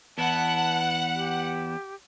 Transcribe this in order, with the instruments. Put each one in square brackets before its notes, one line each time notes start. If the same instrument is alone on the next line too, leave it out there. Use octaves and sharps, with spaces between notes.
[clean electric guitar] E2 B3 E4 [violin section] F#5 [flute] A5
[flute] G4